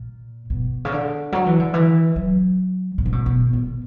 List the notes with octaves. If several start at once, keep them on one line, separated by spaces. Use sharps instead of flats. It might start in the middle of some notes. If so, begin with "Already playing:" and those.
Already playing: A#2
B2
C#3
D3
F#3
E3
D3
E3
F#3
B2
C#3
B2
B2
A#2